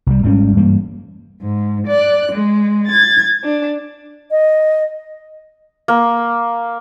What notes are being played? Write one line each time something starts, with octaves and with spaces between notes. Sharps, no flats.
C2 G3
G#1 G#2 G3 C#4
G2 E3 G3 A#3
G#2
D5 F#6
G#3
G#6 A6
D4
D#5
A#3